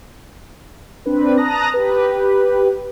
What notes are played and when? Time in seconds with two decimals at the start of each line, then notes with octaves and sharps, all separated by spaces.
1.06 C4 D4 B4
1.37 A5 A#5 D#6 F#6 A#6
1.74 G4 B4